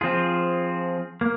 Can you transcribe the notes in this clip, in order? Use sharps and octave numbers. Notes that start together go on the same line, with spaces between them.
F3 C4 F4 G#4
A#3